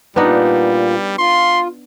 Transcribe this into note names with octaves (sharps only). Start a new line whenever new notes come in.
A#2 G3 B3 D4 D#4
F4 C6